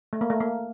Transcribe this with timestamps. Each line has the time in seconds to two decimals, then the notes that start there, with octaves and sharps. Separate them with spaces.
0.13 A3
0.21 A#3
0.30 A3
0.40 A#3